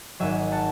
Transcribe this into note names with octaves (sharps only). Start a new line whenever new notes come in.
G#1 G#2 F#3 E5 G#5
F#5 A5